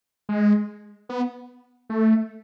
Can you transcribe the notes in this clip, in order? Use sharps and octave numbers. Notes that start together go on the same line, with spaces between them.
G#3
B3
A3